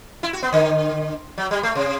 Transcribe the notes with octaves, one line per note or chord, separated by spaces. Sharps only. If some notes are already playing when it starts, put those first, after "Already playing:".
E4
F#4
B3
D3
F#3
G3
A3
C3